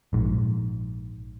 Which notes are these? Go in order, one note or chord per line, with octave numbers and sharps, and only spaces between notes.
A#1 G#2